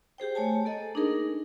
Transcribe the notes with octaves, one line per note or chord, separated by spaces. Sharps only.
G4 G#4 C5 G5
A3 C#5 G#5 A5
A#3 A4 D#5
D4 D#4 G#4 A#4